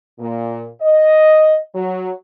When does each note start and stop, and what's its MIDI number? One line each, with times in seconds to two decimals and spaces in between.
0.19 0.67 46
0.81 1.57 75
1.75 2.12 54